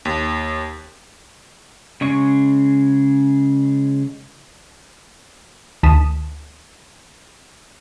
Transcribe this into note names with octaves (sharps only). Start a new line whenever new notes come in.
D#2
C#3 G#3 C#6
D2 D#3 A5 D#6 B6 E7